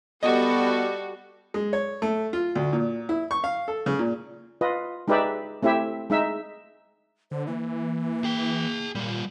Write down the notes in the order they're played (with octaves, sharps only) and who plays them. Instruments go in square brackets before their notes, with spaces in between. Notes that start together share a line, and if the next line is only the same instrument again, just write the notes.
[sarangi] G3 [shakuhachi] B3 [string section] F#4 A4 [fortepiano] D#5
[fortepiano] G#3
C#5
A3
F4
D2
A#2
E4
C#6
F5
A4
C#3
A#2
[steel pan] F4 B4 D#5
G#3 D#4 G4 B4 D5 E5
A3 C4 E4 G4 E5
G#3 D#4 E5
[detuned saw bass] D3 [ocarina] C5
[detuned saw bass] E3 [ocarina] A#3
[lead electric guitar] G#4 G5
[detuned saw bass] A#2 [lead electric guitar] G3 F4